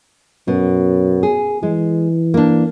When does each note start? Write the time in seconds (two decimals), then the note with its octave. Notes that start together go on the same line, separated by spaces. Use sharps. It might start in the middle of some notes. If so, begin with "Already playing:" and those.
0.48 F#2 B2
1.23 G#4
1.63 E3 G#3
2.34 A#3 D4